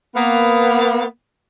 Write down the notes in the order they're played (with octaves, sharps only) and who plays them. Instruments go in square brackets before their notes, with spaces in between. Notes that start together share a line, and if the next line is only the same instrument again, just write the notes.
[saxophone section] A#3 B3